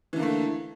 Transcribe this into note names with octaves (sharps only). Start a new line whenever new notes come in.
D3 E3 A3 A#3